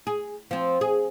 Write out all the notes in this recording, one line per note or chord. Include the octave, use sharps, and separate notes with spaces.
G#4
F3 C4
G#4